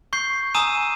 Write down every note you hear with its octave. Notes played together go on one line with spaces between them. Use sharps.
C#6 G6 C7
G#5 A#5 D#6 E6 D#7 E7